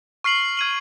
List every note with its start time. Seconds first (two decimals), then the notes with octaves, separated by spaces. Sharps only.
0.24 C#6 F6 C7 F#7
0.57 F6 G#6 D#7 F#7